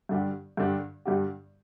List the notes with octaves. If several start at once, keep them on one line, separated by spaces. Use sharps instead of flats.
G2 D3 G3 D4 G4
G2 D3 G3 D4 G4
G2 D3 G3 D4 G4